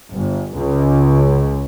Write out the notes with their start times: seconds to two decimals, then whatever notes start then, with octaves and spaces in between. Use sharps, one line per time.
0.11 G1
0.55 C#2